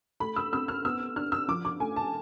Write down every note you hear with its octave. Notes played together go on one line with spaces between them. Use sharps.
A3 B5
E6
C4 E6
F6
B3 E6
D4 F6
E6
F3 D6
D6
A3 G#5
A5